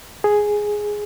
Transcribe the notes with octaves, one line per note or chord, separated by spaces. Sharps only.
G#4